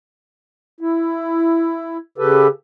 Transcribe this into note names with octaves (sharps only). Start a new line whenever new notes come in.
E4
C#3 G4 A4 B4